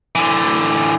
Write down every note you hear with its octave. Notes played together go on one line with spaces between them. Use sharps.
D3 E3